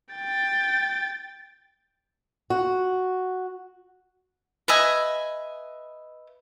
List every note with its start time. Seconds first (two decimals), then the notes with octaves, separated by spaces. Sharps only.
0.14 G5 A6
2.50 F#4
4.68 B4 D#5 E5 G#5